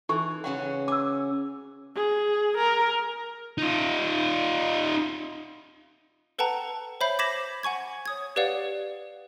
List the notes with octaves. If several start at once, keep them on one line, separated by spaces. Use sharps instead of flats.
E3 D#4 A4 C#6
C#3 C#4 F#4 F#5
G#5 D6 E6
G#4
A#4
D#4 F4
A4 B4 F#5 G5 A5 A#5
C5 C#5 E5 B5 G6 C7
D6 G#6 A#6 B6 E7 F#7
F#5 G#5 C#6 G#6
C#5 D#6 G#6
G4 B4 C#5 D5 F5 F#5